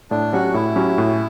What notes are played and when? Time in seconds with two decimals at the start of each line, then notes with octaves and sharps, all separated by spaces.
0.11 A2 D4
0.33 F#3 C#4 F#4 G4
0.54 A2 E4
0.76 F#3 C#4 G4
0.98 A2